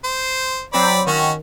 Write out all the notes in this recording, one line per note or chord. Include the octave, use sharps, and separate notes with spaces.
C5
F#3 C4 C5 D5 B5
D#3 C#4 F#4